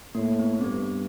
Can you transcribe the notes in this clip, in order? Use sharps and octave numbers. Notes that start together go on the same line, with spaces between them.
A2 A#3
B3
C4
G2 B3